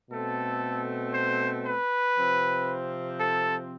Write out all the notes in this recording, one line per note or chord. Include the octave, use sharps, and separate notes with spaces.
B2 A3 C4 A4
C5
B4
C3 F3 C4
A4